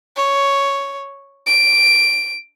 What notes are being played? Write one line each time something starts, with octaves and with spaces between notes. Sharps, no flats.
C#5
D7